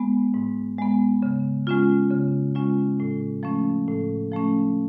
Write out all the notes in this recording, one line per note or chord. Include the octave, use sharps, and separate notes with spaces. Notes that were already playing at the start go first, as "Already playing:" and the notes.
Already playing: G#3 B3
G#2
G#3 B3
C#3
G#3 C#4 F4
C#3
G#3 C#4 F4
A2
F3 A3 C#4
A2
F3 A3 C#4